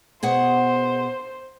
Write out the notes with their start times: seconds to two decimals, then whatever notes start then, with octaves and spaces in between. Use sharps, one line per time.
0.23 B2 G#4 C5 F#5